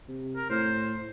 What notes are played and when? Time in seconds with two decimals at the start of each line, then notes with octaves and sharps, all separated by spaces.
0.08 C3
0.36 A#4
0.50 A2 C5